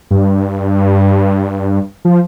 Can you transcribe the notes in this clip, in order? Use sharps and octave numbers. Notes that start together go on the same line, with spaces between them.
G2
F3